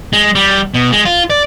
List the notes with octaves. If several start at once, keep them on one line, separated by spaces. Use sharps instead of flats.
G#3
G3
B2
G#3
F4
D5